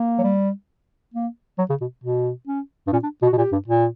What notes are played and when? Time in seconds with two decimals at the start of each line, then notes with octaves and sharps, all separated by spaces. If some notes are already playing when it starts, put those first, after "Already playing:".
Already playing: A#3
0.18 F#3
0.23 G3
1.14 A#3
1.58 F#3
1.70 C#3
1.81 B2
2.04 B2
2.47 C#4
2.87 G2
2.93 A#2 C#4
3.03 D4
3.22 B2
3.27 F#4
3.33 B2
3.37 A#2 G4
3.52 G2
3.68 A#2